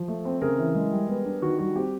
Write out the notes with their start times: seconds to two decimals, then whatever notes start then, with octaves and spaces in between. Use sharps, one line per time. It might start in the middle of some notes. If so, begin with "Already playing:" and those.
Already playing: F3
0.08 A3
0.25 C4
0.41 C#3 G#4 A#4
0.58 E3
0.75 G#3
0.92 G3
1.09 B3
1.26 D4
1.42 D#3 F#4
1.59 G3 F#4
1.76 C4 G4